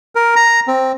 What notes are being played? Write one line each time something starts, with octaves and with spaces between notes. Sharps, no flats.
A#4
A#5
C4